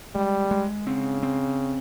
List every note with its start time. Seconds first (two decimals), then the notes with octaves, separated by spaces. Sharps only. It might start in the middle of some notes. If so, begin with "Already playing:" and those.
0.15 G3 G#3
0.51 G#3
0.87 C#3 C4
1.23 C4